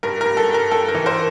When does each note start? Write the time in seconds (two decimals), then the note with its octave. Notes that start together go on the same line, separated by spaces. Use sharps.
0.03 G2 A#4
0.21 G2 A#4
0.37 A4
0.49 G2
0.54 A#4
0.71 G2 A4
0.88 A#4
0.95 E3
1.06 A#4 C5